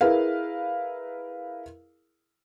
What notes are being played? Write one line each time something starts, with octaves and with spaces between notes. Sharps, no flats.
E4 G#4 A#4 B4 F5